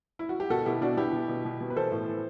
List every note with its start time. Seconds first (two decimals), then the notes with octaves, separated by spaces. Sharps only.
0.19 E4
0.29 F#4
0.40 G4
0.50 B2 F#4 A4
0.65 B2 E4 G4
0.81 B2 D4 F#4
0.97 B2 E4 G4
1.13 B2
1.29 B2
1.45 B2
1.61 B2
1.70 B4
1.76 E3 A4 C5
1.92 A2
2.08 E3